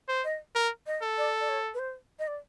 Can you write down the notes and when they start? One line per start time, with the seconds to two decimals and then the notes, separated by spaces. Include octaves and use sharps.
0.08 C5
0.24 D#5
0.55 A#4
0.87 D#5
1.02 A4
1.18 D5
1.40 D5
1.49 C#5
1.74 B4
1.79 C5
2.19 D#5
2.27 D5